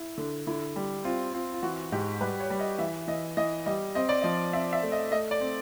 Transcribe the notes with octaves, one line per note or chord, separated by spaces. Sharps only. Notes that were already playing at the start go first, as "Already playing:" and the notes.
Already playing: E4
D3
D3 E4
G3
C4 F4
C4 F4
F4
E3 F#4
G#2 G4
G3 B4
C#5
G3
D#5
E3 E5
E3 D#5
E3 D#5
G3 D#5
C4 D#5
D5
F3 D#5
C4 E5
E5
A3
D#5
A3 D#5
D5
C4